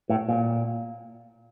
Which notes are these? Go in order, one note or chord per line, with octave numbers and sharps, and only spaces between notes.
A2
A#2